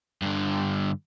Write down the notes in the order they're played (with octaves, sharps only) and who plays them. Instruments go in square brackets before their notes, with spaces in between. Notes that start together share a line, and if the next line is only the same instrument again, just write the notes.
[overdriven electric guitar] G2 D3